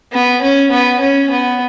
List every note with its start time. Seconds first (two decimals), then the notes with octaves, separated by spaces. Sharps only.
0.12 B3
0.42 C#4
0.71 B3
1.00 C#4
1.30 B3